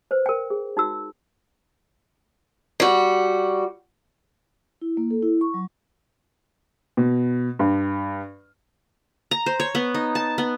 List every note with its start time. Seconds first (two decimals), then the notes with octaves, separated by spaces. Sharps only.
0.11 B4 C5
0.26 A#4 G5
0.50 G#4
0.77 D#4 F#4 E6
2.80 G3 F#4
4.82 E4
4.97 A#3
5.11 A4
5.22 E4
5.41 C#6
5.54 F#3
6.97 B2
7.59 G2
9.31 A#5
9.46 C5
9.60 C#5
9.75 B3
9.94 D#4
10.15 A5
10.38 B3